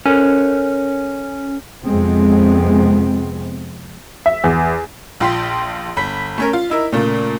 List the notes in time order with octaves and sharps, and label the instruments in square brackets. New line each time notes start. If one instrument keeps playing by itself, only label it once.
[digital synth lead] C#4 [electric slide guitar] A4 A#4 C#5
[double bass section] F2 C3 G#3 B3 C4
[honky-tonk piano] E5
E2
A#1 F4 G5 C6 B6
G1 B5 B6
A3 C#4 A#4
F4
D#4 E4 A#4
A#2 C#3 A3 A#3